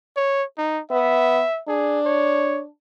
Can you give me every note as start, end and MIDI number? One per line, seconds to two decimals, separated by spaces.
0.17 0.43 73
0.58 0.80 63
0.91 1.42 59
0.91 1.60 76
1.69 2.67 62
1.69 2.00 68
2.05 2.61 73